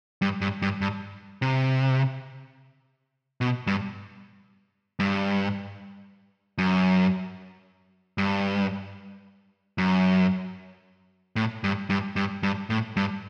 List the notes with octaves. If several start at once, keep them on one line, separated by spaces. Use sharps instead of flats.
G2
G2
G2
G2
C3
B2
G2
G2
F#2
G2
F#2
A2
G2
G2
G2
G2
A2
G2